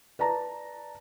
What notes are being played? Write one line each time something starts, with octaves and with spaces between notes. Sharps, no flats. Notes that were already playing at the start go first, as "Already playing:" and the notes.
B4 D5 A5 A#5